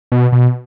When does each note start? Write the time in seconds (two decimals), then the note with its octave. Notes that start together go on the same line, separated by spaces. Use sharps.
0.12 B2
0.32 B2